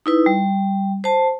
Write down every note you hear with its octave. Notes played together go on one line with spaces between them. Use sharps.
D#4 E4 B4
G3
C5 A5